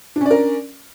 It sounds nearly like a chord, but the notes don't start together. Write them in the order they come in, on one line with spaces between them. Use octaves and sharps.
D4 C#4 D5 A#4